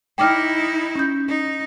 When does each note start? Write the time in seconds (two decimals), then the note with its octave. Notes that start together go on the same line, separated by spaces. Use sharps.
0.18 D#4 E4 G5 D6 F6
0.96 C#4 G6
1.28 D#4